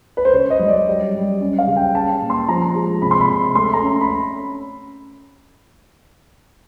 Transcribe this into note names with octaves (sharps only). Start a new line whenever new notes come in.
B4
C5
C#3 C#5
D#5
F#3
D5
G3
G3
C#4
F5
C#3
G5
C#4 A5
A#2
C6
F3 A#5
G#3
C3 B5
C6
B5
C3
A3 C6
A#5
C#4
B5